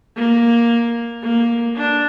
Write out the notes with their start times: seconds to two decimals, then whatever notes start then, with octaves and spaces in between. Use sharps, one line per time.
0.17 A#3
1.23 A#3
1.76 D4